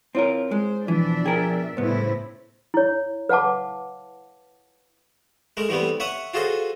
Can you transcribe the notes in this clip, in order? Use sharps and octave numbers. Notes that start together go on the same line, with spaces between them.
C4 E4 F4 A#4 C#5
G#3 C5
B2 E3 F3 D4 E5
G#4 A#4 G5
C2 A2 C#3 B3 E4 C5
E4 C#5
B4 F5 F#5 A5 D6
G#3 A3 A#4
E3 G3 A3 B3 C4
C#5 E5 F#5 C#6 D#6
F4 F#4 G#4 A4 C5 D#5